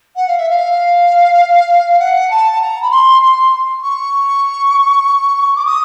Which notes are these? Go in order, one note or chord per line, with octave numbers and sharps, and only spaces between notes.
F#5
F5
E5
F5
F#5
A5
A#5
B5
C6
C6
C#6
D6
D#6